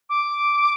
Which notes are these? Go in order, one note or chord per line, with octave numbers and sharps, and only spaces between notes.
D6